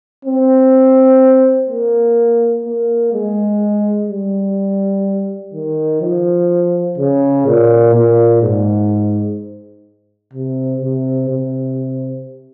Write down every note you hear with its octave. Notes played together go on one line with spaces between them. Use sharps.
C4
A#3
A#3
G#3
G3
D#3
F3
C#3
A#2
A#2
G#2
C3
C3
C3